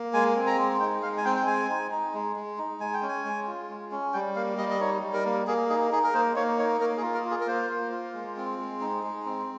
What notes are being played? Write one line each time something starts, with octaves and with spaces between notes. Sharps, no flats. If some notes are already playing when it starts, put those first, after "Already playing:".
Already playing: A#3
G#3 G#5
C4
A#5
G#3
D#4 G5
G#3 F5
G#5
C4 G5
G5
G#3 G#5
D#4
D#4
G#3
G#3
D#4
G#3 G#5
G5
C#4
G#5
G#3
F4
G#3
C#4
G3 G5
A#3 F5
G3 D#5
D#5
D#4 C#5
G3
A#4
A#3
A#3 G#4
D#4 G#4
D#4 G#4
A#4
A#3 C5
A#3 C#5
D#4 C#5
A#3 A#4
G#4
F4
A#4
F4
G#4
A#4
A#3 C5
A#3
F4
G#3
C4
G#3
D#4
G#3
C4